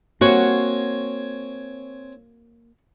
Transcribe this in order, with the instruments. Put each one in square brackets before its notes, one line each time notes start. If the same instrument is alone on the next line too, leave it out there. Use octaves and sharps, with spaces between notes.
[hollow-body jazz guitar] A#3 [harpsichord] C4 C#5 G#5 [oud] F#4